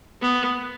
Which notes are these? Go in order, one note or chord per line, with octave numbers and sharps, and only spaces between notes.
B3